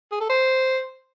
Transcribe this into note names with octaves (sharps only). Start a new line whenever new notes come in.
G#4
A4
C5